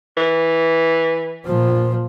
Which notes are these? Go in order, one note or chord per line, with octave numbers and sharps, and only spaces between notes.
E3
A#2 F3